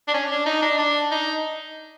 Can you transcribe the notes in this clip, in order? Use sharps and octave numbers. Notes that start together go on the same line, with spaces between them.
D4
C#4
D4
D#4
D4
D4
D#4